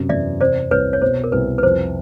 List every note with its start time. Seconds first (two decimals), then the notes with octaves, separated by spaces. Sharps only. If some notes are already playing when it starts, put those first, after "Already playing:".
Already playing: F#2 C3
0.09 E2 D5 E5
0.40 C3 C5 D5
0.71 C2 B4 C#5
0.93 C#5
1.02 B2 C5
1.24 A#4
1.32 C2 B4
1.58 B4
1.63 F2 C5